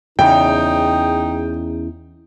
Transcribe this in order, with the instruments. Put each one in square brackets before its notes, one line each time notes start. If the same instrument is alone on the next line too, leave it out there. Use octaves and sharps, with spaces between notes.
[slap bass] E2 C#3 [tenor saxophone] D#4 [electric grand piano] G5